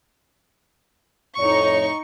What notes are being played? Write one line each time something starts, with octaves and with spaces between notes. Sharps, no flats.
F2 A2 D#4 C#5 C#6